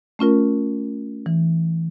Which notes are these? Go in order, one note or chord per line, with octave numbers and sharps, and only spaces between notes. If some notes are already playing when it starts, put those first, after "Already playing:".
A3 C#4 F4 A#4
E3